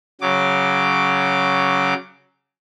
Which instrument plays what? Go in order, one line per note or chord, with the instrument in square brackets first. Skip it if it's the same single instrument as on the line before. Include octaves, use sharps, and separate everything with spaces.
[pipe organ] C#3 F#3 D6